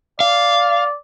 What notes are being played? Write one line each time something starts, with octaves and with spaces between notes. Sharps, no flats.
D5 F5